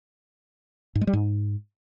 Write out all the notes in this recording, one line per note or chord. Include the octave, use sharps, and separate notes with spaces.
G#2
G#3
G3
G#2